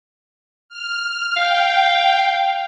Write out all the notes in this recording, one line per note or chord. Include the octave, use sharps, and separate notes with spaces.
F6
F5 G5